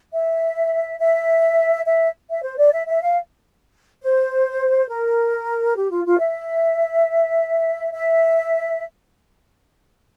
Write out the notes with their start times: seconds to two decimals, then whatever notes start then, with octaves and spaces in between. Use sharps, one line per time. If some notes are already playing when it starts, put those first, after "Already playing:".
0.13 E5
0.99 E5
1.86 E5
2.30 E5
2.44 C5
2.58 D5
2.73 E5
2.87 E5
3.02 F5
4.02 C5
4.89 A#4
5.76 G4
5.91 F4
6.05 F4
6.20 E5
7.93 E5